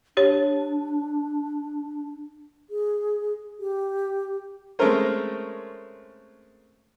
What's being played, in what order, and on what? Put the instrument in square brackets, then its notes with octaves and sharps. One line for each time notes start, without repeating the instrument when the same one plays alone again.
[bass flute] D4 [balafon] G4 C#5
[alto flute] G#4
G4
[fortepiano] G#3 A3 C4 C#4 A#4 C5